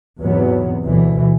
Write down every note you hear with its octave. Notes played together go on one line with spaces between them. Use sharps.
E2 G#2 C3 F#3 B3
D2 B2 E3